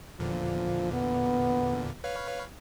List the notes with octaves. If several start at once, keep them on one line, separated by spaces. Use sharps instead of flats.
E2 A#2 D3 F3
B3
B4 C#5 F5